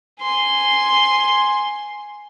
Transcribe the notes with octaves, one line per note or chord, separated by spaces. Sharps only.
G#5 C6